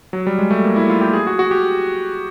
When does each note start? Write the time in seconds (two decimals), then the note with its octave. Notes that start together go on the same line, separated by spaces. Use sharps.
0.13 F#3
0.27 G3
0.39 G#3
0.51 A3
0.64 A#3
0.76 E4
0.89 F4
1.01 G4
1.13 G#4
1.27 F#4
1.39 F#4
1.51 G4